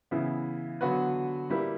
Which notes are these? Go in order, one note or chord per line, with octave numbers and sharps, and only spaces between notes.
C#3 E3 B3 E4
D3 F#3 B3 F#4 B4
G3 A#3 E4 G4 B4